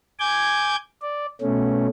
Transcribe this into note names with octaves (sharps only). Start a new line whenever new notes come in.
G#5 D6 G6 G#6
D5
B2 A3 C#4